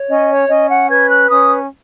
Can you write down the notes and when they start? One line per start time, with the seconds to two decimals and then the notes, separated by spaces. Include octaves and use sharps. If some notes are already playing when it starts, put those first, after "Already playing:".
Already playing: C#5
0.09 C#4 D#5
0.30 C#5
0.49 C#4 D#5
0.69 F#5
0.89 B4 G#6
1.10 F#6
1.30 C#4 D#6